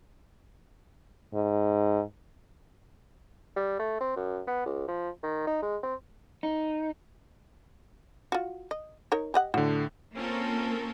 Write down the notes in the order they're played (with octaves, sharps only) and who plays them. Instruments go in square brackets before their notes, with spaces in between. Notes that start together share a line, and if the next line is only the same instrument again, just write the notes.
[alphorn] G#2
[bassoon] G3
A3
C4
F#2
B3
C#2
F3
D#3
D#4
G#3
C4
[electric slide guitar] D#4
[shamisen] F4 F#4
D#5
D#4 A#4 C#5
G4 D#5 F#5
[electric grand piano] A2 D3 [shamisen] F#4
[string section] A#3 C4 C#4 F4 A4 A#4